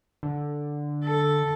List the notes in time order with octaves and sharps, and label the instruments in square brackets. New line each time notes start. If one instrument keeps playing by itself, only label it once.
[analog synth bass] D3
[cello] A4